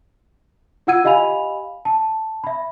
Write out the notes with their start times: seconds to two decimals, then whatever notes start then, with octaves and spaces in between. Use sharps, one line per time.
0.87 E4 F4 F#5 E6 G#6 D#7
1.04 G4 D#5 F5 G#5 B5 F7
1.85 A5
2.44 E5 B5